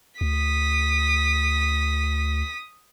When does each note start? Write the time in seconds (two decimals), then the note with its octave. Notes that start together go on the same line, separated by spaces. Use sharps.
0.21 D2 D#6 B6